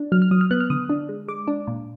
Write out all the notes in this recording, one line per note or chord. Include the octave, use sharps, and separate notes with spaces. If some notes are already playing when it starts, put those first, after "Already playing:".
Already playing: D4
F#3 F6
F6
F#3 D#6
F6
B3 F#6
F6
D3 D#6
D4
G#3
G#3 D6
D4
A#2